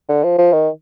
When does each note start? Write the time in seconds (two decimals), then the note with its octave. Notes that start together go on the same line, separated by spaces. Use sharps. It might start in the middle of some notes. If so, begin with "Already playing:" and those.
0.09 D3
0.24 F3
0.38 F3
0.53 D#3